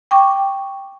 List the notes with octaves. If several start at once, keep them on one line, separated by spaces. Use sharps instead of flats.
G5 C#6 D6